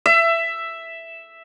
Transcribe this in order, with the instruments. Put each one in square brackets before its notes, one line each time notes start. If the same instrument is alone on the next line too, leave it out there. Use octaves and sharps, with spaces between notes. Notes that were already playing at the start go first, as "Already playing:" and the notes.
[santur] E5